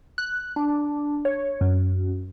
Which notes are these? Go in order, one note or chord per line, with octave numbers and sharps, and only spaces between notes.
F#6
D4
C#5
F#2